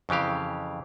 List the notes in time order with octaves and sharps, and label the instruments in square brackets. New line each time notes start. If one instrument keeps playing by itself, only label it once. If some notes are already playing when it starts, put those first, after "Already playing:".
[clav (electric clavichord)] F2 C#3 E3 G4 F5